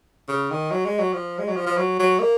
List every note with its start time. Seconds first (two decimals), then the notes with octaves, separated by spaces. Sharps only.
0.29 C#3
0.50 D#3
0.71 F#3
0.85 G#3
0.99 F#3
1.14 F3
1.39 G#3
1.48 F#3
1.57 F3
1.67 F3
1.77 F#3
1.99 F#3
2.19 A#3